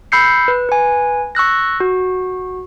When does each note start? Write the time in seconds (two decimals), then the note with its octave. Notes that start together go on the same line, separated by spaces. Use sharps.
0.12 B5 E6 G6 C7 C#7
0.48 B4
0.69 B4 G#5
1.35 C#6 E6 F#6 A#6
1.80 F#4